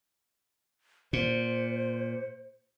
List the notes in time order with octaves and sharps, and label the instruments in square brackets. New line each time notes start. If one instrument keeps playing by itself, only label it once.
[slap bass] A#2 [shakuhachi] C5